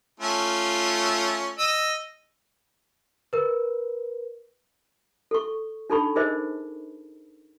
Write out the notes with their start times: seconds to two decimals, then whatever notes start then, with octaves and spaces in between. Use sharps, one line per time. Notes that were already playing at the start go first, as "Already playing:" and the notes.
0.20 A3 C#4 F4
1.58 D#5 E6
3.33 A#4 B4
5.31 A4 C#6
5.90 D4 D#4 A4 A5 B5 C#6
6.16 D#4 G#4 A#4 C5 D#5